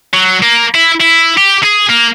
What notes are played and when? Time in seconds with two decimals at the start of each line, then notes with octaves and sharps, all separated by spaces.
0.14 F#3
0.42 A#3
0.75 E4
1.01 E4
1.37 G4
1.63 G#4
1.89 A#3